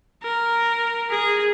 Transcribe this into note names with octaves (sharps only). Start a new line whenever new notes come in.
A#4
G#4